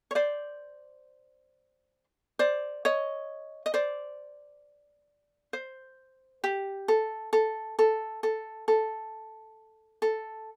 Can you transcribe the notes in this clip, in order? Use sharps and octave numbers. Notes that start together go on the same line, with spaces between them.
C#5
C5 D5
C5 D5
C#5 D#5
D#5
C5 D5
C5
G4
A4
A4
A4
A4
A4
A4